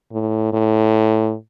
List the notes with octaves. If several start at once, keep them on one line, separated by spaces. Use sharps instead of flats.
A2
A2